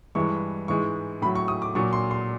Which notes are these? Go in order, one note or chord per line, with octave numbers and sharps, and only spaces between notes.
G2 E3 G#3 C#6
G#2 E3 G#3 C#6
A2 F#3 B5
C#6
D#6
D6
A#2 F#3 C#6
C6
C6